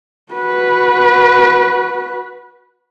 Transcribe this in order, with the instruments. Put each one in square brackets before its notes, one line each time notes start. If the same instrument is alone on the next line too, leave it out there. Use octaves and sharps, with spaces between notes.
[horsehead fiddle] F#4 B4